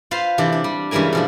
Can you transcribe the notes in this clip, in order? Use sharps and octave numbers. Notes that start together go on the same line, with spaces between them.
F4 B4 C5 F5
C3 E3 D4
D4
G3
G2 C#3 E3 G#3 A#4 G#5
B2 F3 D4